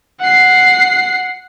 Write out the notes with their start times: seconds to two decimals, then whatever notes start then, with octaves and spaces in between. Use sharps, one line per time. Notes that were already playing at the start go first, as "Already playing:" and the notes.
0.20 F#5 C7